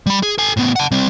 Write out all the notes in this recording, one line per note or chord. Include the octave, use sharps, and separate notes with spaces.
G3 B5
G#4
A4 G#5
A2 B3
F#5 A5
G3 C4